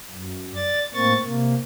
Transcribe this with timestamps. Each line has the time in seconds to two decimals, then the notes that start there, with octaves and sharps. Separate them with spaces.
0.11 F#2
0.55 D5 A6
0.94 A2 A#3 C4 C#6 A6
1.24 C3 A#3